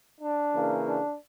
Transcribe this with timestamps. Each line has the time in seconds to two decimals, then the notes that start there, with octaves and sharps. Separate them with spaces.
0.21 D4
0.54 C#3 E3 A#3
0.87 D4